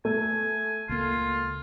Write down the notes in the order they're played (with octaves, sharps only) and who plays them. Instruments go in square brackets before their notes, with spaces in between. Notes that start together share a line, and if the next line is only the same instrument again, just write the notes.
[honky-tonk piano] A3 [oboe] G#5
[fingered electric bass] C#2 A#3 [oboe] F4